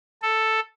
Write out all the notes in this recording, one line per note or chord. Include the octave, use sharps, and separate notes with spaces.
A4